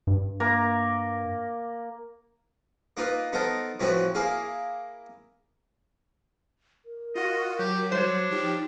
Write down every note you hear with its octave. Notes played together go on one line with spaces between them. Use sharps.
G2
A#3 A#5
A#3 D#4 F4 B4
B3 D#4 A4 A#4 C5
A2 E3 F3 C4 E4 F#4
A#3 E4 G#4 F5
A#4
F4 F#4 D#5
F#3 G4
G3 D4 C5 C#5
F3 D#4 G4